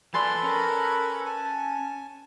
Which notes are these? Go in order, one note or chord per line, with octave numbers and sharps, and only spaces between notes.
F3 A4 B4 D5 G#5 B5 C6 A6
C#4 A#4
G#5 A5